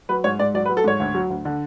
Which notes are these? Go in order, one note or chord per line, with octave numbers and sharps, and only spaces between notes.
F#3 B4
G#2 C#5
G#2 D5
F#3 D5
B4
F#3
A4
G#2 C#5
D2
F#3
D2
D3